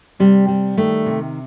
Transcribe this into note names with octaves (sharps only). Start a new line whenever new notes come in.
C3 G3
G3
D#3 A3
C3